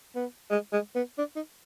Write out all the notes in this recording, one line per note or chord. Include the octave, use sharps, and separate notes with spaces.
B3
G#3
G#3
B3
D4
D#4